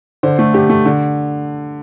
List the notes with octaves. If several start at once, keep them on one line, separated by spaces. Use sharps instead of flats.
D3 C5
A3
D3 G4
A3
D3